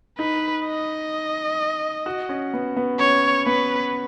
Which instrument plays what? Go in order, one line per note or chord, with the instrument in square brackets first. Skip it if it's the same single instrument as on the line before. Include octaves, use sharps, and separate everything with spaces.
[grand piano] D#4 [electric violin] B4
[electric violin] D#5
[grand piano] F#4
C#4
B3
B3
[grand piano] C#4 [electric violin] C#5
[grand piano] B3 [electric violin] B4